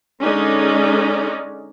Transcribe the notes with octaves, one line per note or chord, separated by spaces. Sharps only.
D3 G#3 C#4 D#4 D5